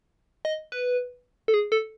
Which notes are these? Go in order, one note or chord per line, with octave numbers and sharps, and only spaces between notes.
D#5
B4
A4
G#4
A4